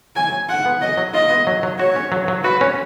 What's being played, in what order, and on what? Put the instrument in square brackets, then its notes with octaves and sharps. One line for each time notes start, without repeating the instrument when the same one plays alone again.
[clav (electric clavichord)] F#3 [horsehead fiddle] G#5
[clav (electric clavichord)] F#3
[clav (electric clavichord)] F4 [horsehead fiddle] F#5
[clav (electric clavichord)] B3
[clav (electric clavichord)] F#3 [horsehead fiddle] D#5
[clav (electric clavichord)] F#3
[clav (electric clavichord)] F4 [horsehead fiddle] D#5
[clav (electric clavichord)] B3
F#3
F#3
[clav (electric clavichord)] F#4 [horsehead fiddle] C#5
[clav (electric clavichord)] C#4
F#3
F#3
[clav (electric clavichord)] F#4 [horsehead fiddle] B4
[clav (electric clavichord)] C#4